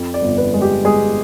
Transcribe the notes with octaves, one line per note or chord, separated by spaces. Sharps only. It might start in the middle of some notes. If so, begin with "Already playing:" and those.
Already playing: F2
D5
G1
B4
G#3
G4
G#3 G#4